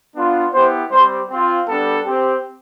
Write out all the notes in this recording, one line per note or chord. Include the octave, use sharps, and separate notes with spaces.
B3 D4 F4
B3 E4 G4 C5
G3 C4 G4 C5
C4 F4
G3 B3 D4 G4 A4
C4 G4